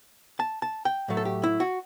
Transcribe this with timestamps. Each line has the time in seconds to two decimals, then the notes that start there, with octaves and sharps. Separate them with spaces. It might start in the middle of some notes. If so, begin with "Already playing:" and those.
0.40 A5
0.62 A5
0.85 G5
1.08 A2 F#3 A3
1.17 A4
1.25 G4
1.44 E4
1.60 F#4